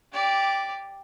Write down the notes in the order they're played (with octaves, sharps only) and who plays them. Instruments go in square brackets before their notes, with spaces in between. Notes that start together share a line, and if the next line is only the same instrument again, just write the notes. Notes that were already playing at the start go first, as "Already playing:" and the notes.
[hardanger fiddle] G4 D5